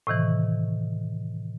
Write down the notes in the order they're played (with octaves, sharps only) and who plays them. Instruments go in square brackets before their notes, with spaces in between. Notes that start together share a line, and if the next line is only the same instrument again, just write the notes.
[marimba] A2 C3 D#3 E3